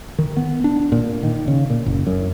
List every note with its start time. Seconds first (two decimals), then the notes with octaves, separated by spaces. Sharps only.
0.19 D#3
0.37 B3
0.64 D4
0.92 A#2
1.23 D#3
1.48 C#3
1.70 A#2
1.86 F#1
2.07 F#2